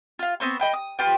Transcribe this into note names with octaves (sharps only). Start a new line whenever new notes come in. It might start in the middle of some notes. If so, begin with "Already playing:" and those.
F4 F5
B3 C4 C5 C#6
D#5 G5 B5
D#6
F4 G4 B4 G5